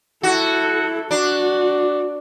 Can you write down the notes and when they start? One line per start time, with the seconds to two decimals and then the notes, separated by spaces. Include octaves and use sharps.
0.23 E4 F#4 A4
1.11 D4 F#4